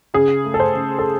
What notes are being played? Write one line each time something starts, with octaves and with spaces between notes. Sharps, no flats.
C#3 G#4
A3
A4
C5
C#3
A4